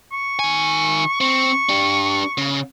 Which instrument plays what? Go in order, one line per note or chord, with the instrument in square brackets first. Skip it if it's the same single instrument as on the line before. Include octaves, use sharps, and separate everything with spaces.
[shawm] C#6
[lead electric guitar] D#3 G#5
[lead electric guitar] C4 [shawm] C#6
[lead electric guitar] D4 G4
C#3